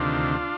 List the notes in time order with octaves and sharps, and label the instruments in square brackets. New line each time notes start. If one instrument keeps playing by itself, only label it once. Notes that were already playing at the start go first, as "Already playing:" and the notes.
Already playing: [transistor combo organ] D2 C3 D#3 D4 F4